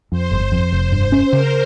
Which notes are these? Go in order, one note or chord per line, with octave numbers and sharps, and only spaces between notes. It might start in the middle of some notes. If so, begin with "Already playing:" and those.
F2 C5
G1
F2
F1
G2 C5
C#4
C#3 A#4